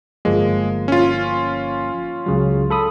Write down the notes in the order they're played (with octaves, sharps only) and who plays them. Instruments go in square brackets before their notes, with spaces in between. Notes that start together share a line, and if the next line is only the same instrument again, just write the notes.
[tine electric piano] G1 F3 A#3 [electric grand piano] G#3
[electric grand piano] C#4 F4
[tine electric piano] C#2 C#3 F#3
A4 B5 D#6